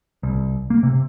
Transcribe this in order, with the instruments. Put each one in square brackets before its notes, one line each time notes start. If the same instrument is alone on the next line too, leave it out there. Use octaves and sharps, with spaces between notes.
[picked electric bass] C2
A#3
C3